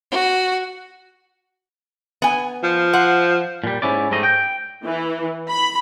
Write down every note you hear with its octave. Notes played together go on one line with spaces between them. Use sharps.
F#4
B3 G#5
F3
C5 F#5
A#2 G3
G#2 C#4 E4 D5
G#2 G3 A3 D#5
G5
E3
B5